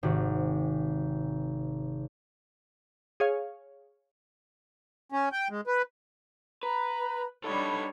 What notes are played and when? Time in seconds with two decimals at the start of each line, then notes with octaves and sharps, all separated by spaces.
0.03 G#1 C3 F#4
3.20 G#4 C#5 F5
5.12 C#4
5.32 G5
5.50 G#3
5.67 B4
6.63 B4 A#5 B5
7.44 G3 D4 D#4 A4 C#5 B5